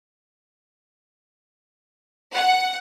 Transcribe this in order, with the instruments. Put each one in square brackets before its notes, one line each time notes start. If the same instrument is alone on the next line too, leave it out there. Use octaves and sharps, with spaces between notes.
[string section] F#5